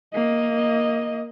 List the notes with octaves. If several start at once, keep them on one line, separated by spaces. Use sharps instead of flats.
A#3 D#5